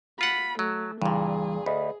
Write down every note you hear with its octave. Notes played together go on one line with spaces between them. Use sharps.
F4 F#5 B5
F#3 A3
C#2 G2 A#2 E3 G3 G#4
D2 D#5 B5